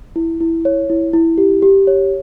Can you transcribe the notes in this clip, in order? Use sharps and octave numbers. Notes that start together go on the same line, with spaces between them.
E4
E4
C#5
E4
E4
G4
G4
C#5